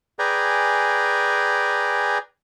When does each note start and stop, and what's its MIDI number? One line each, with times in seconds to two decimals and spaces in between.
0.19 2.18 68
0.19 2.18 71
0.19 2.18 74
0.19 2.18 79
0.19 2.18 80
0.19 2.18 82